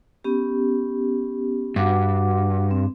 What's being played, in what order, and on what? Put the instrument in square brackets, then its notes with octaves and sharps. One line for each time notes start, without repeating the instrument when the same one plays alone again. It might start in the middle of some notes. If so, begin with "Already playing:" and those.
[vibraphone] B3 C#4 G4
[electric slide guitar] G2 [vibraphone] F#4 F#5 D6
[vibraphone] C4